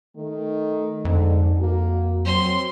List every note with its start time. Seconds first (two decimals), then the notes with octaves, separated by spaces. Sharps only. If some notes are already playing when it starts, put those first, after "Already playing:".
0.16 D#3 A3
1.05 F2 G#2 D3
1.61 A#3 F#4
2.25 F#3 C4 C6